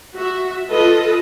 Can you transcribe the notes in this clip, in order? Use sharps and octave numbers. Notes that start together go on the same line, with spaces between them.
F#4 E5
F4 A4 B4 D#5